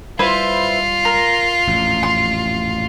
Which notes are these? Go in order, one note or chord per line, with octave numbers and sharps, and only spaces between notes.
G3 E4 F4 B4 C5
A#4
A1 F2 A#2
C6